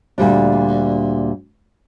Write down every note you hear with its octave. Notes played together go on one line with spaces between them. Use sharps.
D2 A#2 G3 D4